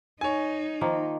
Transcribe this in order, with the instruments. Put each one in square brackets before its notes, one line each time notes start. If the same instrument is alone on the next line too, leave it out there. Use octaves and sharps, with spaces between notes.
[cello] D#4 [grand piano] C#5 G#5
[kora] D#3 F3 A#3